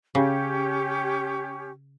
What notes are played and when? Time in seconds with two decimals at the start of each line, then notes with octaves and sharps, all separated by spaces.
0.15 C#3 C#4 G4